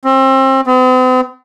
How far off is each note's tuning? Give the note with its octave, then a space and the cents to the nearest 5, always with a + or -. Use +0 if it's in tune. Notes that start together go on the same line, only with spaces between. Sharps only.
C4 +30
C4 -45